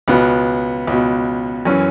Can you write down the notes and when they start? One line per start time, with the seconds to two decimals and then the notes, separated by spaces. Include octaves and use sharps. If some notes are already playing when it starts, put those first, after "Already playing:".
0.08 C#2 B2 B3
0.87 C#2 B2
1.65 F#2 E3 C#4